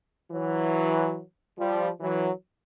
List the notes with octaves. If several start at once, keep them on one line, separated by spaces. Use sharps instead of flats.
E3 F#3
F3 G3
E3 F#3